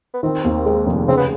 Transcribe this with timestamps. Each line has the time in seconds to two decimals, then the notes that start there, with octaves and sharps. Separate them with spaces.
0.14 B3
0.23 D#3 C4
0.44 D#2
0.66 G#3
0.86 F1
1.08 C#3 C4
1.17 B3